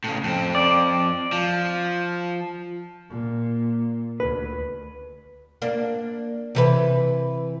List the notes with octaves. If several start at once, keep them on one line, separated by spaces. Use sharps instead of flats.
A2 C#3
F2 C4
D5
F3
A#2
D2 B4
A#3 D4
C3 E3 B4